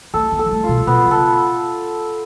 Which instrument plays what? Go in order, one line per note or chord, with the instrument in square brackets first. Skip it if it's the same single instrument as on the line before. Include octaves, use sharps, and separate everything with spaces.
[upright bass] A3 [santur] A4
[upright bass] B3
[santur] A4
[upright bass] G#3
A3
[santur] F4
[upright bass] B2
[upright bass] B2 [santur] B3
[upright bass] C#3
[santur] A4